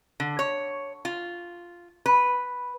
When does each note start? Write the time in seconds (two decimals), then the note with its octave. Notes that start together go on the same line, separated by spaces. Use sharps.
0.20 D3
0.39 C#5
1.05 F4
2.06 B4